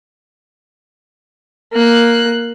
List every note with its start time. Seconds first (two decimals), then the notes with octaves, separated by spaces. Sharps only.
1.73 A#3 F#6